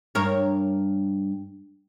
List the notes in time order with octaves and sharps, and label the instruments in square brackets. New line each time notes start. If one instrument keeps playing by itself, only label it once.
[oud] G2 A#4 C#5